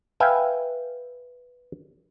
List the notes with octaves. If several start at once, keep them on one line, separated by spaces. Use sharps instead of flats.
B4 E5 F5 G5 G#5